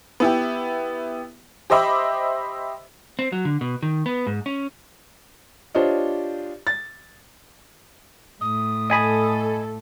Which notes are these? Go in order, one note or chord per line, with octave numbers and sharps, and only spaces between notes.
B3 E4 G4
G4 C5 D#5 E5 B5 D6
C4
F#3
D3
B2
D#3
B3
G#2
C#4
D4 F4 G4 C5 C#5 D#5
A6
A2 D#6
A4 D#5 G#5 B5